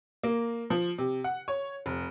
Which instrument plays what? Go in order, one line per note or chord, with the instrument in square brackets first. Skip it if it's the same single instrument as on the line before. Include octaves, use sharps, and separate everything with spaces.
[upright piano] A#3
F3
C3
F#5
C#5
F1